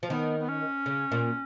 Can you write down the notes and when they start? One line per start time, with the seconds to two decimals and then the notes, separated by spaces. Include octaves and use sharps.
0.03 F3
0.10 D#3 B3
0.39 B3
0.48 C#4
0.86 C#3
1.12 A#2